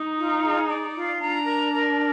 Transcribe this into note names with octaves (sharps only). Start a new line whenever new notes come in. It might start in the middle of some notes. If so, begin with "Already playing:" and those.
Already playing: D#4
F4
G#4
D5
F4
D4 A#5
A#4
A#4